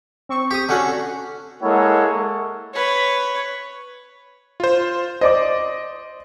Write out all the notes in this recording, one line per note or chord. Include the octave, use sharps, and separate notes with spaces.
C4 C#6
G4 D#6
D3 C#4 F#4 F#5
G#3 A#3 E4 A4 C#5 F#5
B4 C#5
F4 C5
C5 D5 D#5 D6